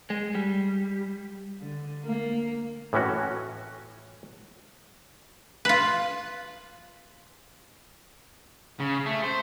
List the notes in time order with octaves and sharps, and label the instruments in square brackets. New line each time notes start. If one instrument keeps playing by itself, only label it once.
[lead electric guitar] G#3
G3
[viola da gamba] D3
A#3
[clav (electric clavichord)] A2 E3 C#4 F#4
[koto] F4 B4
[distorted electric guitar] C#3
A3
C5